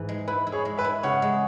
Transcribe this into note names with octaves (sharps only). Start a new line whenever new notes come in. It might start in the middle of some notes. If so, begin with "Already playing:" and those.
Already playing: G#2 E3
G#3
E4 B4
E4
G#4 C#5
G#3
B4 E5
E4
C#3 C#5 F#5
G#3